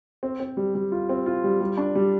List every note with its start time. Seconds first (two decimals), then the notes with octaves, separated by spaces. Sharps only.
0.23 C4
0.40 C4
0.57 G3
0.75 G3
0.92 F4
1.09 C4
1.26 F4
1.44 G3
1.60 G3
1.77 D4
1.95 G3